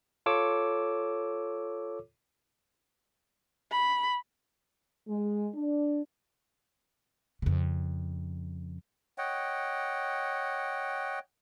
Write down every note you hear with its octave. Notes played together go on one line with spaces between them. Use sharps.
F4 A4 C#5 D6 E6
B5
G#3
D4
F2 C#3
C#5 D#5 F#5 G5